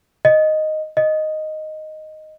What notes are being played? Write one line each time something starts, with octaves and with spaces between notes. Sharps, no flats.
D#5
D#5